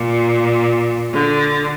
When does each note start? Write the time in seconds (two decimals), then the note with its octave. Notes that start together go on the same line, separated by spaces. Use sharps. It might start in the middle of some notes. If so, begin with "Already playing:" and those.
Already playing: A#2
1.14 D3